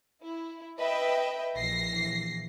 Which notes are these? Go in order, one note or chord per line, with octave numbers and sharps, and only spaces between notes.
E4
B4 D#5 E5 G5
A#1 E3 A#6 C7